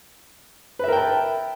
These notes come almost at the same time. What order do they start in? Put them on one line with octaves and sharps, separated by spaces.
B4 E5 A#4 G5 A5